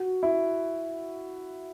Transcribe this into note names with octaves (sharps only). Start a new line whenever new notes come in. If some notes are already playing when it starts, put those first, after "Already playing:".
Already playing: F#4
E4